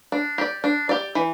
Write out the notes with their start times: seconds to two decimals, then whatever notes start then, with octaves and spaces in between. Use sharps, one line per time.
0.12 D4
0.38 G4 D5
0.64 D4
0.89 G4 D5
1.15 E3